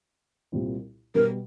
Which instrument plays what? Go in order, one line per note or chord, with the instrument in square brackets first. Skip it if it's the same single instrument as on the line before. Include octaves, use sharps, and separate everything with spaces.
[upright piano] C2 A#2 G3 C4 F4
[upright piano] B2 G3 B3 [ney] A#4